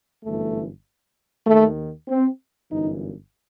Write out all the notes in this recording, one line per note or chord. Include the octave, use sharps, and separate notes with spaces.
G1 F#2 E3 A3
D#2 D#3 A3
C4
G1 F#2 E3 D#4